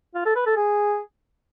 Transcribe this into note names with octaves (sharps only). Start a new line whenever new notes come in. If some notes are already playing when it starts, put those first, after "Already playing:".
F4
A4
B4
A4
G#4